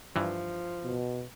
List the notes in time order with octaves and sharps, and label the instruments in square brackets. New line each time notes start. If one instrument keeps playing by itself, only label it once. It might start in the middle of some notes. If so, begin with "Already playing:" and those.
[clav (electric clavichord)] G2 E3 [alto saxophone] F3
[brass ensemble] B2